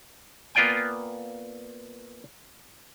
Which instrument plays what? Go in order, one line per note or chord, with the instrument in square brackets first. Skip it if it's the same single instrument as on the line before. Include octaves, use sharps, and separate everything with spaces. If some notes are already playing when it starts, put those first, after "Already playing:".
[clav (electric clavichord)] A#3 B3 F4 D5 G5 G#5